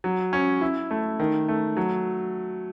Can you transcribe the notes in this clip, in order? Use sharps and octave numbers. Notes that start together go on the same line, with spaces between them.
F#3
C#4
E4
A3
D#3
A3
F#3